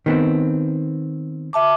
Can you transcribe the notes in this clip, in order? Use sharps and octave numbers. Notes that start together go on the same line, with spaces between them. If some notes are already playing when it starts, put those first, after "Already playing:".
D#3 B3 C4
E5 A5 D6